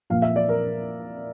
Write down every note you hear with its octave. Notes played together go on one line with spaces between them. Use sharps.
A#2 F3 A#3 F5
E5
D5
A#4